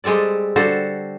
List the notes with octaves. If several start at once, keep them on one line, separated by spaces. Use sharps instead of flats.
G3 G#3 C4 A4 D5
D3 G3 F#4 A4 C5